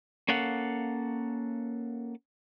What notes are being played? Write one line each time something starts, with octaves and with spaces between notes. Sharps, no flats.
A#3 C#4 A4 F5 F#5